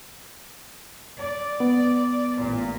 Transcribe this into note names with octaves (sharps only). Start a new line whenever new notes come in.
D5
B3
A1 A#2